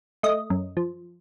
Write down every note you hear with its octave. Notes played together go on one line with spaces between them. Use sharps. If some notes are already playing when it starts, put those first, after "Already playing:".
A3 D#5
F#2
F3